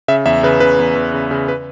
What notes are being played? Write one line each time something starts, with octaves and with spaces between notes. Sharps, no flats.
C#3 E5
E2 E5
C#3 B4
C#3 B4
E2
E2
C#3
C#3
B4